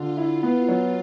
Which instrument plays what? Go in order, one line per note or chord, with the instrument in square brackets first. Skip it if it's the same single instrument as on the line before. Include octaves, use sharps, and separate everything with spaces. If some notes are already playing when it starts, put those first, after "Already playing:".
Already playing: [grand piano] D3 [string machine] F4
[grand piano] E4
B3
F#3